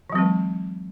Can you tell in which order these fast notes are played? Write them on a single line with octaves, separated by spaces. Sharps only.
E3 F#3 C4 G#3